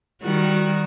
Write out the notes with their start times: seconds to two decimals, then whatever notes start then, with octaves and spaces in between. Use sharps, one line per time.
0.22 D#3 G3 F#4